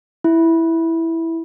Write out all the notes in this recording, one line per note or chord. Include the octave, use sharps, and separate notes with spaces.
E4